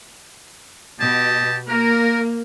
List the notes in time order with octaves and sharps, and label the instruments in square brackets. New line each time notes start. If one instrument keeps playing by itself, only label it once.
[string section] B2 [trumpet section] G4 D#5 A5
[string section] A#3 [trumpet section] A#4